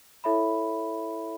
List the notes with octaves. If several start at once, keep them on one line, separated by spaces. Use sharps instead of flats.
E4 A4 C#5 E5 B5